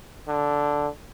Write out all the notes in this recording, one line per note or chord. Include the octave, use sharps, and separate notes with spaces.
D3